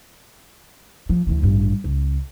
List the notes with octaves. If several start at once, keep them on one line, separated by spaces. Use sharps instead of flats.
F3
D2 E3
A1 G2
C#2